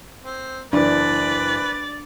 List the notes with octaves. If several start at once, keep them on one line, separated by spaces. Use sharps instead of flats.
C4
F#1 E3 D4 B4 D5